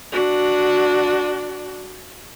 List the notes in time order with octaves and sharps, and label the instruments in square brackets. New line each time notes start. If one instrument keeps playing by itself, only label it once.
[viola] D4 F#4